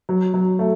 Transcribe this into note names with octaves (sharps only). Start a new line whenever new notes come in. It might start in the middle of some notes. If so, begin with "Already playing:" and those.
F#3
F#3
A3